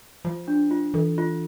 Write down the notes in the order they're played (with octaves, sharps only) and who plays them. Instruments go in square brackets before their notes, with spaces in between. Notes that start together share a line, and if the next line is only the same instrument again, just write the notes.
[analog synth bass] F3 [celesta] F4
[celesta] D4
F4
[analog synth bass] E3 [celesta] A4
[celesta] F4